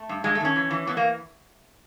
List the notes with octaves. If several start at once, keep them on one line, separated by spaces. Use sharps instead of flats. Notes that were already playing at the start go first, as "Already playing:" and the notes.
Already playing: A3
G2
G2 G#3
A3
D#3 C#4
E3
E3
E3 B3
A#3